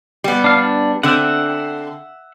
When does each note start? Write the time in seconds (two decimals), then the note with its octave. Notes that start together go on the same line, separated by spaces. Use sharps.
0.24 G3 B3
0.44 D4 F5
0.57 D4
1.03 D3 C4 E5 F#5